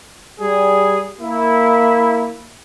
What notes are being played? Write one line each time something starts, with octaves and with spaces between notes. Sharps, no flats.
G3 G#4
A#3 E4